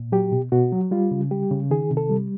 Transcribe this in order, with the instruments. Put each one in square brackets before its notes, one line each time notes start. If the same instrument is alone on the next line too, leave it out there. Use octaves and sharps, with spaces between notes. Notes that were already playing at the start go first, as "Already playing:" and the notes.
Already playing: [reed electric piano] A#2
F#3 G4
B2
B2 F#4
F#3
G3 F4
C#3
G3 G4
C#3
D#3 G#4
C3
A4
G3